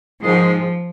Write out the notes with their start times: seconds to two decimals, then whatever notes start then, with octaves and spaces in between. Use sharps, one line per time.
0.23 G#2 D#3 F3 G#3